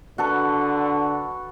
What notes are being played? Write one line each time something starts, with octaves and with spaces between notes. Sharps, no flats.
D3 F#4 A4 B4